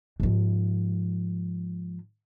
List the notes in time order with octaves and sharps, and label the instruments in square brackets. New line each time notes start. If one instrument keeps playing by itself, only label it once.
[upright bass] G#2 F3